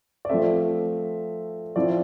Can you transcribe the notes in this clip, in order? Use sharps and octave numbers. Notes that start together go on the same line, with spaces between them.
D5
F3 A3 C4 E5
F3 C4 E4 D5